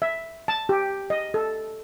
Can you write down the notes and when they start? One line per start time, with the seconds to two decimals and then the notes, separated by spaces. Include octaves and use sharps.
0.02 E5
0.48 A5
0.69 G4
1.10 D#5
1.34 A4